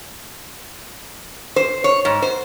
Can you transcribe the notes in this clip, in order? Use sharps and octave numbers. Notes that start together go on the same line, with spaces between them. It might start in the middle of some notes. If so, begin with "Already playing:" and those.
C5
C#5
G#2
C5